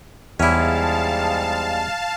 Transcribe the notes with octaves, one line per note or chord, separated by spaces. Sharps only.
E2 G#2 G3 G#3 C#4 E4 F5 A5